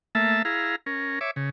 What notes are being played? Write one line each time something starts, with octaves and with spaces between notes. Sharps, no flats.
A3 A#3 E5 A5
E4 G#4 F5 A#5
C#4 A#4
C#5 E5 D6
C#3